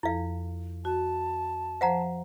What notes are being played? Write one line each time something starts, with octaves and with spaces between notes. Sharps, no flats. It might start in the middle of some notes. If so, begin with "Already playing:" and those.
F2 F3 E4 A4 F5
F#4 A5
F3 C5 F5 F#5 A#5